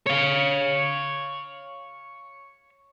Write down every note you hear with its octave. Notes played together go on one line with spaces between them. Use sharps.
C#5 F5